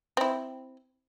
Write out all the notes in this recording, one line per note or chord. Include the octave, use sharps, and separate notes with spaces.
C4 E4